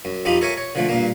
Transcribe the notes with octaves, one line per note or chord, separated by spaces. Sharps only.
F#2
F2 D#4 F4 G4 B5
A4 A#4 C#5 E5 G#5 C#6
C#5
D3 F3 A3
G2 A#2 A#3